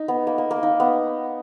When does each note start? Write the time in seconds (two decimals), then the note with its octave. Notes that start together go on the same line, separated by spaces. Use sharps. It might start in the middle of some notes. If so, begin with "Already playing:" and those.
Already playing: D#4
0.08 B3
0.27 A#3
0.38 A#3
0.51 A#3
0.63 D#4
0.80 B3